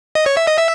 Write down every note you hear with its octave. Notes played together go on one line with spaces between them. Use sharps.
D#5
C#5
E5
D#5
E5